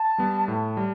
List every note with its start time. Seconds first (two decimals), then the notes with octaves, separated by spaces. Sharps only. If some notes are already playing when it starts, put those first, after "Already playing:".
Already playing: A5
0.18 G3 B3
0.47 A2 A5
0.77 G3